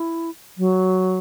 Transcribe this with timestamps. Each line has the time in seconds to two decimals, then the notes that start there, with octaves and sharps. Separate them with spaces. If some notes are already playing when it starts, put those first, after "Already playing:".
Already playing: E4
0.58 F#3